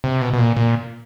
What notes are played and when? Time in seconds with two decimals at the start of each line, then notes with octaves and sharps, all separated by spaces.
0.04 C3
0.21 B2
0.33 B2
0.38 A#2
0.57 A#2